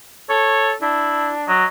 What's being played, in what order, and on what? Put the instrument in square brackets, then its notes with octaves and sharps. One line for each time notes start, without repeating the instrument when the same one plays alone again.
[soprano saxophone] A4 [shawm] C#5
[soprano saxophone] D4 [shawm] E4
[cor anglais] F#3 [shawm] D#5